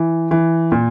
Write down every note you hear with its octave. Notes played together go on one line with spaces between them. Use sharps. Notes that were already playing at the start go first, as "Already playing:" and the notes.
Already playing: E3
E3
A#2